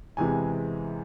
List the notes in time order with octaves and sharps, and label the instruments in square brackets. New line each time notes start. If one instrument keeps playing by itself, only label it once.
[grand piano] E2 C3 E3 G#3 G#5